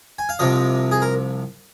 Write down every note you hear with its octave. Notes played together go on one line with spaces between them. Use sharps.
G#5
F5
C2 C3 F3 D#5
G#4
A#4